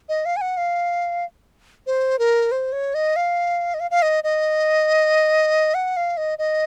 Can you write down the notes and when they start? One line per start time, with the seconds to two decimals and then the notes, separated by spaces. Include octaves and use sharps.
0.09 D#5
0.25 F5
0.36 G#5
0.41 F#5
0.57 F5
1.87 C5
2.19 A#4
2.52 C5
2.72 C#5
2.94 D#5
3.16 F5
3.74 D#5
3.80 F5
3.91 F5
4.02 D#5
4.24 D#5
5.74 F#5
5.97 F5
6.17 D#5
6.39 D#5